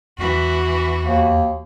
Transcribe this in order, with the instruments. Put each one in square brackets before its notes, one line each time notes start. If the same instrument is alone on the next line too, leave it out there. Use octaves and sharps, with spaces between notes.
[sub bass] E2 [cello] E3 F#4
[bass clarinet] D#2